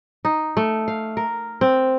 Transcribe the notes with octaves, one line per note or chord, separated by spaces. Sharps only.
D#4
A3
F5
A#4
C4